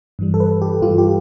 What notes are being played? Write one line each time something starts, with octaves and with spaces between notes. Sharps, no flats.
G2 E3 G3
A4
B4
G4
G2 E3 G3 F4
G4